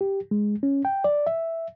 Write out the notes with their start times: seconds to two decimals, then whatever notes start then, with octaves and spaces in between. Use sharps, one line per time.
0.01 G4
0.31 G#3
0.63 C#4
0.85 G5
1.04 D5
1.27 E5